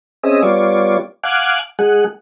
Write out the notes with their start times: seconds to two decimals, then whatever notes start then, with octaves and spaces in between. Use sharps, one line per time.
0.24 C4 C#4 G#4 D#5 E5
0.43 G3 B3 F4 C#5 D5
1.24 F5 F#5 G#5 D6 F#6
1.79 G#3 G#4 F#5